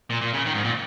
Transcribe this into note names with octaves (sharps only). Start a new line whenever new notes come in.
A#2
A#2
C#3
D#3
G#2
A#2